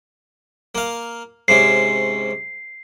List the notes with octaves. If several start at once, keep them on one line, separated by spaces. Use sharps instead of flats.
A#3 F5
G#2 C3 C#4 C7